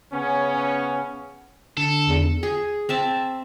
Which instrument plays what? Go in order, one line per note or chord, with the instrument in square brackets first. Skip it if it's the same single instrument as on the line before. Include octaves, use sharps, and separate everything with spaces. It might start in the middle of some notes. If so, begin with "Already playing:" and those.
[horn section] C#3 B3 C#4
[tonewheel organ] D3 [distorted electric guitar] A4
[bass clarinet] E2
[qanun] G#4
C4 E5 A5